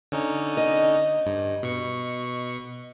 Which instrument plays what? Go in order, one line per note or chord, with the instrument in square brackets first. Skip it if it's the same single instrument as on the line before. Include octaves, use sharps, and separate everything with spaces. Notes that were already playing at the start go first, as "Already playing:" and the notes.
[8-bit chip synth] D3 C#4 D#4
[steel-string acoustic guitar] D#5
[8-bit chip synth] G2
B2 C#6